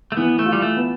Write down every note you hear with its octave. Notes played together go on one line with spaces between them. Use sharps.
A3
E3 B3
A3
F4
G3
A3
B3